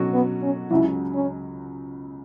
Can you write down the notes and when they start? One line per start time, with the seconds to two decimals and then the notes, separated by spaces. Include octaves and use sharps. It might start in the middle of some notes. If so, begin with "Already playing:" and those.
Already playing: B2 F#3 C#4 F#4
0.13 B3
0.43 C#4
0.71 C#2 C#3 F#3 E4
1.14 C#4